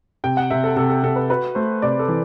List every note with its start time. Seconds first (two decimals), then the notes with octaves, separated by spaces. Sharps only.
0.24 C3 G5
0.37 F#5
0.50 C3 E5
0.64 A4
0.76 C3 A4
0.89 A4
1.03 C3 A4
1.16 B4
1.30 F#4 B4
1.55 A3 C5
1.82 C3 D5
1.99 A4
2.08 E3